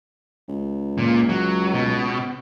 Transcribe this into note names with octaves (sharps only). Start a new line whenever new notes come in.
C#2
A#2
F#3
B2